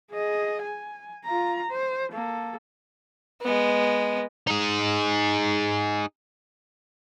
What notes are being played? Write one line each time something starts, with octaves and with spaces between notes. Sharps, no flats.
G#4 D#5
G#5
F4 A#5
C5
A#3 A4
G#3 B3
D#4 G#4